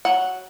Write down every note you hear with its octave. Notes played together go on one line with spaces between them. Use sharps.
F#3 F#5